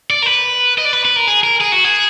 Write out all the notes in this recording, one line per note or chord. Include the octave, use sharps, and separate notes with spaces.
D5
A#4
B4
D#5
D5
B4
B4
A#4
G#4
A#4
G#4
F#4
G#4